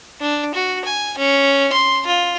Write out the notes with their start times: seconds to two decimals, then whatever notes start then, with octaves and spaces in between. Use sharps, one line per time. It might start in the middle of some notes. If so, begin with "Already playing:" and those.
0.21 D4
0.54 F#4
0.85 G#5
1.18 C#4
1.72 C6
2.07 F4